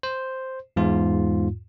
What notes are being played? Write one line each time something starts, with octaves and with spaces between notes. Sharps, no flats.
C5
E2 G#2 F4